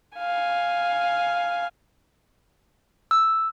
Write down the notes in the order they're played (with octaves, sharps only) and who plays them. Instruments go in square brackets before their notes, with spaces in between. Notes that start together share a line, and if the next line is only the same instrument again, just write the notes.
[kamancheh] F5 G#5
[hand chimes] E6